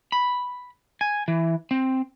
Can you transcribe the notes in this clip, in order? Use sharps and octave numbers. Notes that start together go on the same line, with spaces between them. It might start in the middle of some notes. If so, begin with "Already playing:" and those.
B5
G#5
E3
C4